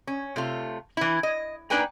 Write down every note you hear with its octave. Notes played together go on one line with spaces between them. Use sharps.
C#4
C3 A3 F4
E3 E4
D#5
A#3 D4 D#4 B4 G5 G#5